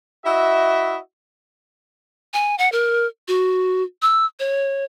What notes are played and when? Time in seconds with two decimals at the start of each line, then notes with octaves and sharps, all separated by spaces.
0.25 E4 F#4 D#5 E5
2.34 G#5
2.58 F#5
2.72 A#4
3.28 F#4
4.02 E6
4.39 C#5